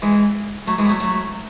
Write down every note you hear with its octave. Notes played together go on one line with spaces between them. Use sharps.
E3 G#3
F#3 A3
E3 G#3
B3
F#3 A3
F#3 A3